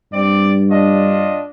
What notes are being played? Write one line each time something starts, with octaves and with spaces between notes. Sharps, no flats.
G2 C4 D5
D4 F4 D#5